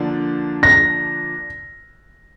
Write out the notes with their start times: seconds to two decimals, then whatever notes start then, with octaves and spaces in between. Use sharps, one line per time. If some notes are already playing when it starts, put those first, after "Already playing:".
Already playing: D3 F3 A#3 D4
0.63 A#6